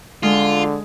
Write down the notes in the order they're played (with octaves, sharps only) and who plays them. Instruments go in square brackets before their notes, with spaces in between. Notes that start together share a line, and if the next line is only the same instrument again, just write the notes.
[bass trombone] D3 [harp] G#3 [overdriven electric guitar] F4